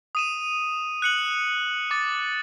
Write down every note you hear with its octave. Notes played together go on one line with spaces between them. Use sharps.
D#6 D#7 E7
F#6 C#7 F#7
D6 A6